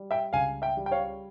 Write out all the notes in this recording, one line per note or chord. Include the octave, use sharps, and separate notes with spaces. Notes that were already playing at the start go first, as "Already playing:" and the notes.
Already playing: G3
E5 G5
C#2 F5 G#5
E5 G5
G3
G5
C#5 F5